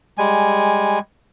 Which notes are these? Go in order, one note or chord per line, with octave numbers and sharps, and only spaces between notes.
G3 G#3 G#5